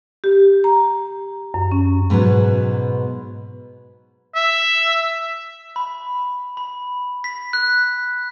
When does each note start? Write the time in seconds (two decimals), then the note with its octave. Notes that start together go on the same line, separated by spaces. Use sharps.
0.24 G4
0.64 A#5
1.54 F#2
1.71 C#4
2.10 G#2 B2 F#3 B3
4.35 E5
5.76 B5
6.57 B5
7.24 B6
7.53 F#6